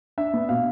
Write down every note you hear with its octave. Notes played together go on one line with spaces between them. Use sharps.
D4 E5
B3
B2 F5